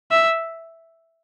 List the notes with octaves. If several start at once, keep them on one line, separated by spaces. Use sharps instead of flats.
E5